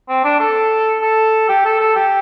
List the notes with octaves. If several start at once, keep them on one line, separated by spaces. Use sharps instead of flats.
C4
D4
A4
A4
G4
A4
A4
G4